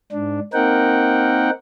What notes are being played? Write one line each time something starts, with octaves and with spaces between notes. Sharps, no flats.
G#2 D4
A#3 C4 D#4 A#4 F#5 G5